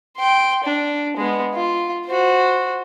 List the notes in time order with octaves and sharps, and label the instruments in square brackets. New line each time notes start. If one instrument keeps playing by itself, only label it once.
[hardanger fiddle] G5 C6
D4
G#3 B3
F4
F#4 C5